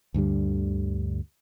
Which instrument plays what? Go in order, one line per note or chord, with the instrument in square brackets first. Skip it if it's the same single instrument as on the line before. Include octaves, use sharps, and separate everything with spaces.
[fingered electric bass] D2 G2 D3 G3